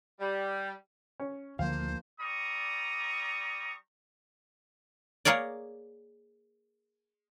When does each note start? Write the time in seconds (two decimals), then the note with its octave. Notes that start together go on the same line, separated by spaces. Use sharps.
0.20 G3
1.20 C#4
1.59 D2 D3 D#3 F3 A#3 C5 F5
2.21 G3 D5 A#5 C#6 D#6
5.25 A#3 G#4 A#4 C#5 D5